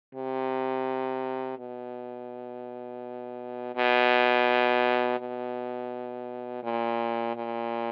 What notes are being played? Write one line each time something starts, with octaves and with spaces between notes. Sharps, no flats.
C3
B2
B2
B2
A#2
A#2